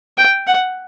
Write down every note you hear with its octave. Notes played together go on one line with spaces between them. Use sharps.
G5
F#5